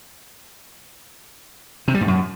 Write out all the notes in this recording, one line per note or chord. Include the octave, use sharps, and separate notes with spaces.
C3
G3
G#2
F#2